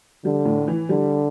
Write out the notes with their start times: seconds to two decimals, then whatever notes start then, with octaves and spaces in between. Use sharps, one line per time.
0.25 D3 G3
0.45 A2
0.68 E3
0.89 D3 G3